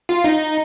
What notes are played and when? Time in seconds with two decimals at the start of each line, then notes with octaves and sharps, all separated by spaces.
0.09 F4
0.24 D#4